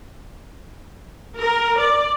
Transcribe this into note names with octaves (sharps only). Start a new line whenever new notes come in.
A#4
D5